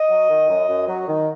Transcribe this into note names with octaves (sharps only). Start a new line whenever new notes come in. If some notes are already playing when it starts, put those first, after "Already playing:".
Already playing: D#5
F#3
D#3
F#2
F#2
F#3
D#3